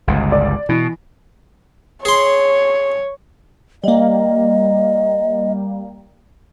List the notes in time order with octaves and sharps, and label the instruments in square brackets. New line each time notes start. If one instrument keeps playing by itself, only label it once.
[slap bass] G1 C#2
[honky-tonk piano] D5
[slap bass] B2 [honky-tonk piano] E3
[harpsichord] G#4 C6 [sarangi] C#5
[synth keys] G3 A#3 [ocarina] D#5